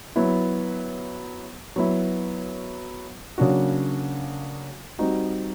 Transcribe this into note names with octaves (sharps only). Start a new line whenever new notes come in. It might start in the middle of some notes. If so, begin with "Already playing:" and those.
F#3 B3 E4
F#3 B3 E4
C#3 F#3 A#3 D4 F#4
G3 C4 D#4 F#4